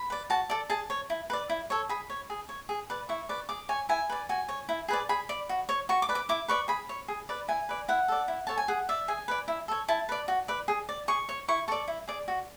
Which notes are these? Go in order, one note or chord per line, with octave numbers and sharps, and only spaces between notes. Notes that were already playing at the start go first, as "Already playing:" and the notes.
Already playing: B5
B4 D5
F#4 A5
A4 D5
G#4 A5
C#5
E4
B4 D5
E4
A4 C#5
G#4 B5
C#5
G#4
C#5
G#4
B4 D5
E4 C#6
B4 D5
G#4 D6
C#5 G#5
E4 G#5
B4 D5
F#4 G#5
C#5
E4
G#4 B4 D5
G#4 B5
D5
F#4
C#5
F#4 C#6
D6
B4 D5
D6
E4 D6
B4 D5 C#6
G#4 B5
C#5
G#4
B4 D5
E4 G#5
B4 D5
E4 F#5
A4 D5
E4
A4 C#5 A5
G#5
G#4 F#5
D5 E5
G#4 G#5
B4 D5
E4
A4 C#5
E4 A5
B4 D5
F#4
B4 D5
G#4
D5
G#4 C#6
C#5
E4 C#6
A4 D5 C#6
E4
G#4 D5
F#4